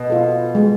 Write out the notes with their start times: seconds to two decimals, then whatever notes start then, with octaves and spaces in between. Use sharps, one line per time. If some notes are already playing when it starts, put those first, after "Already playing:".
Already playing: B2
0.10 F4 A4
0.55 G#3